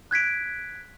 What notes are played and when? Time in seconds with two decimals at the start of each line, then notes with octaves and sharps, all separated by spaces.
0.11 F#6 G#6 B6 D7